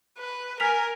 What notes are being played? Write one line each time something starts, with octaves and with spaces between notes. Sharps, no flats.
B4
A#4 G#5 F6 B6 F7